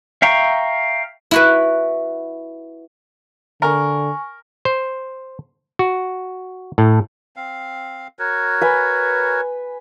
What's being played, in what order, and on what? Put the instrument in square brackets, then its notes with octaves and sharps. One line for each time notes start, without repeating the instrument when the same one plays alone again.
[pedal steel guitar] E5 F5 G5 A#5 C#6
[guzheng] E4 F#4 B4
[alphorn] D3 [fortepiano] A#4 [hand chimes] G#5 C#6
[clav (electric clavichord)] C5
F#4
A2
[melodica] C4 F5
F#4 A#4 C#5
[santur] B4 G#5